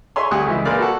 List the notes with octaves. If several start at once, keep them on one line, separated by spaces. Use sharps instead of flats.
G#4 C#5 E5 G#5 C6
D2 G3 F#5 C#6 D#6
C#2 E3 E4
A#1 A#4 B4 D5 F5 D6
F#4 A4 F#5